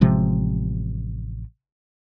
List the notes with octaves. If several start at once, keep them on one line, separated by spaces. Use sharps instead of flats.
A1 C3 F3 G#3